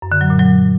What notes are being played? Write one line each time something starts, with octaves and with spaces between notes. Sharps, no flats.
F#2
D3
F#3
A#2
F#3